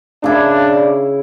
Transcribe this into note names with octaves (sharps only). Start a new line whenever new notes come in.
C#3 D4 E4